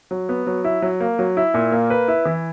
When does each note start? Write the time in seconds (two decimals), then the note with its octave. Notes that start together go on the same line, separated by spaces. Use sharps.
0.11 F#3
0.29 B3
0.47 F#3
0.64 E4
0.82 F#3
1.00 A#3
1.19 F#3
1.37 E4
1.54 A#2
1.72 A#3
1.90 B4
2.08 E4
2.25 E3